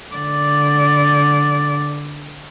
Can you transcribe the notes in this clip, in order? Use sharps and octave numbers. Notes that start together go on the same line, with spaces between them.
D3 D5